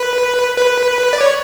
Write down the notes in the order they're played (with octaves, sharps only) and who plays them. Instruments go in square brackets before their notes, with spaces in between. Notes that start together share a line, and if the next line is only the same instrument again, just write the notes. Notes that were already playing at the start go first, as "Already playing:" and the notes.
Already playing: [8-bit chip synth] B4
B4
D5
C#5